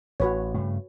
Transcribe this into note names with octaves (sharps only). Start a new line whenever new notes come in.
A1 F#4 B4 C#5
G2 C#3 A3